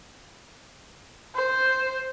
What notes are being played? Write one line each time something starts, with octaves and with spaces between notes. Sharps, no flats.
C5